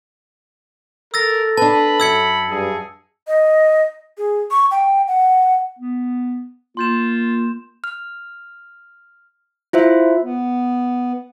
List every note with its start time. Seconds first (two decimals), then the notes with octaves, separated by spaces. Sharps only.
1.14 A4 A#4 E6 A6 A#6
1.57 D4 B4 A5 B5
2.00 F#2 E6 G#6 C#7
2.51 G2 G#4
3.27 D#5
4.18 G#4
4.51 C#6
4.71 G5
5.08 F#5
5.79 B3
6.77 A#3 F4 C6 G6 E7
7.84 F6
9.73 E4 F4 C5 E5
10.23 B3